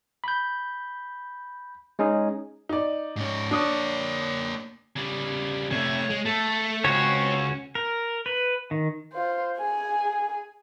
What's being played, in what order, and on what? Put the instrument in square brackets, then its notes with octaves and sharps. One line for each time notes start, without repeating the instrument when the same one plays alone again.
[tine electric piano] B5 G6
G#3 C#4 D#4 G#4
[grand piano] D#4 D5
[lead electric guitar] G#2 C#4
[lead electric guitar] A#3 C#5 [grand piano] D4 D#6
[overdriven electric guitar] C#3 G3
[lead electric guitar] C3 A3 [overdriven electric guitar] C#5
[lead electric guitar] G#3
[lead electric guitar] A3 [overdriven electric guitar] A4
[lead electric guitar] C#2 [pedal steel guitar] C#4 F#4 C#5 [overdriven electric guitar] C5 G5
[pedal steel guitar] A#4
B4
D#3
[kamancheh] F4 C5
G#4 G#5